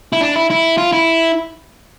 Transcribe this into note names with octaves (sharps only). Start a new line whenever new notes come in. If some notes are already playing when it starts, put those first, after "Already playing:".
E4
D4
E4
E4
F4
E4